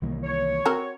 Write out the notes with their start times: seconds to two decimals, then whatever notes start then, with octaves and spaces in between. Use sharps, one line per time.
0.02 C2 D#3 E3 A#3
0.24 C#5
0.66 C4 F#4 A#4